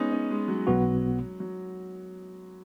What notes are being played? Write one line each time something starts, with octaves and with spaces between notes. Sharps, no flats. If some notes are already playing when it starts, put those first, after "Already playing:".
Already playing: G#3 B3 C#4 D#4
C#4
G#3
F#3
B1 B2 B3 F#4
F#3